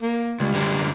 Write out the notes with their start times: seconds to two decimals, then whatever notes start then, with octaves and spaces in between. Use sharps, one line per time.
0.02 A#3
0.40 C#2 G3
0.54 F#2 D3